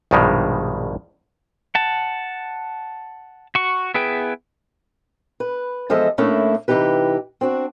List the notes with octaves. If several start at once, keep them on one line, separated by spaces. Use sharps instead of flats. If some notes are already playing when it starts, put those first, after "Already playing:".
A#1 G2 B2 D#3 G3 G#3
F#5 A5
F#4 C#6
B3 E4 G#4 B4 G5
B4
E2 F3 G#3 A4 D#5 E5
A2 A3 A#3 C#4 D4 E4
C3 E3 D#4 G4 B4
C4 D4 F#4